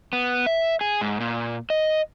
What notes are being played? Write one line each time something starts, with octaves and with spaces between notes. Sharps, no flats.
B3
E5
G#4
G#2
A#2
D#5